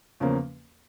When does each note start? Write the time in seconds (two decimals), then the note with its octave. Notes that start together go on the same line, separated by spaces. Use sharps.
0.20 E2 C#3 F3 A#3 C#4